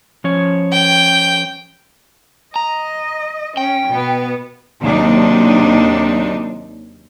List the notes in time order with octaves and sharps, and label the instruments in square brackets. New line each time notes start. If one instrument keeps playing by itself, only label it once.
[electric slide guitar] F3 C#4 C#5
[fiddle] G5
[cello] D#5 [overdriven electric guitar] A#5
[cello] C#4 [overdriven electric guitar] G5
[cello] B2 B3
[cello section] D#2 C3 F#3 D4 D#4